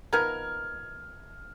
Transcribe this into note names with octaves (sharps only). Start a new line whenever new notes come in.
F3 B3 D#4 A#4 F6 G#6